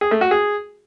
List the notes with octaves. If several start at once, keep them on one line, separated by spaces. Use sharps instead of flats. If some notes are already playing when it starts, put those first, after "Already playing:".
G#4
A3
F#4
G#4